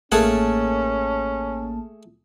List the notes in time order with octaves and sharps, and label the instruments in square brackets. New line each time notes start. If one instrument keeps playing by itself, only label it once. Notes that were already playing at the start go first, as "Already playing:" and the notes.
[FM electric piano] A1 A#3 A5 [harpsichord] A3 G#4 F#5 [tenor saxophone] C#4